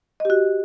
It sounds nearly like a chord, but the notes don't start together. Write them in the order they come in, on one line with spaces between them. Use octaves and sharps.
D#5 G4 F#4